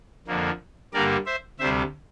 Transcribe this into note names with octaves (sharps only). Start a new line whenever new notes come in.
F2 D3 F3 A#3
G2 D3 G3 A#3 A#4 D5
C5 E5
D2 C3 G3 C5 E5